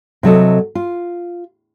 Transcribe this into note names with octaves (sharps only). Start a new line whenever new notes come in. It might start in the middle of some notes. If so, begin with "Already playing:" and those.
C3 F#3 A4 D#5
F4